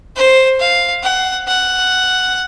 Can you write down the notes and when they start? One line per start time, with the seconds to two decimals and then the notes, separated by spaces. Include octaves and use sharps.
0.16 C5
0.60 F5
1.03 F#5
1.48 F#5